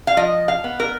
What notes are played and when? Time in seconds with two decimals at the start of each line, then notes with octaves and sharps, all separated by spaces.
0.07 F5
0.17 F3 D#5
0.48 F5
0.64 B3
0.80 A#4